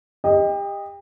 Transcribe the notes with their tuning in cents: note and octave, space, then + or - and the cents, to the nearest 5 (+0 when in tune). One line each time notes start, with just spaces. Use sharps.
G4 +30 D#5 +0